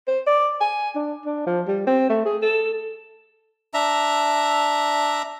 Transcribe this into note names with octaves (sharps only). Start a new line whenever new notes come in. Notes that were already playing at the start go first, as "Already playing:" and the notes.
C5
D5
G#5
D4
D4
F3
G3
C4
A3
G#4
A4
D4 E5 A#5